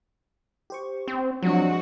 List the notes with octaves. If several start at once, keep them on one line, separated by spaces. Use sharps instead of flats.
G4 C5 C#6
C4
F3 F#3 G#3 C4 D4 F#4